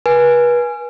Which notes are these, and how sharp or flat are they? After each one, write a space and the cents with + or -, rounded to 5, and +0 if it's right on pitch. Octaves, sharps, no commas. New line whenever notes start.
B4 -35 G#5 +0